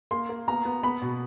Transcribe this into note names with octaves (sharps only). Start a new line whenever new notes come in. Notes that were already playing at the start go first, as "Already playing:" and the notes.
A#3 C6
A#3
B3 A#5
B3
B3 B5
B2